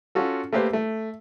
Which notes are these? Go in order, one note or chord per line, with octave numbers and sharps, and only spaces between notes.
C#4 F4 F#4 A4
A3 A#3 G4 B4 C5
A3